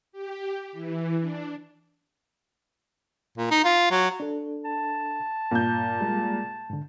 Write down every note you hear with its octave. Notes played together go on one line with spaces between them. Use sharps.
G4
E3
D4
A#2
D#4
F4
F#3
D4 A4
A5
G2 A#2 G6
G3 G#3 G#4
G#2 D3